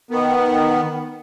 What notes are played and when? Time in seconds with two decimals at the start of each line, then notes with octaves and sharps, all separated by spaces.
0.11 D#3 B3